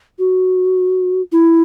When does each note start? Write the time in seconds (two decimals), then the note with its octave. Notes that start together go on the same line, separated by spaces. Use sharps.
0.19 F#4
1.32 E4